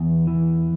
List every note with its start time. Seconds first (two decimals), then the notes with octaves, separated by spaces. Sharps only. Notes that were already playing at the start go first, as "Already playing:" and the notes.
Already playing: E2
0.27 E3